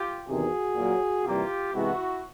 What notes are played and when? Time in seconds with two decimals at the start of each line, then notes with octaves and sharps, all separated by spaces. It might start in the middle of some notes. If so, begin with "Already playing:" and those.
Already playing: F4 G4
0.27 E2 C3 D#3 F#4 G#4
0.76 A#2 F#3 A#3
1.25 C3 E3 G3 A#3 F4 G4
1.73 C3 E3 G#3 B3 E4 F#4